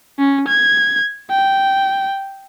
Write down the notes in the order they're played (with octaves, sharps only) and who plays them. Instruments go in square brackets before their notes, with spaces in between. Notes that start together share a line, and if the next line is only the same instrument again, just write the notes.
[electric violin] C#4
G#6
G5